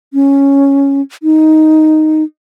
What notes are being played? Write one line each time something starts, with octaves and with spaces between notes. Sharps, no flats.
C#4
D#4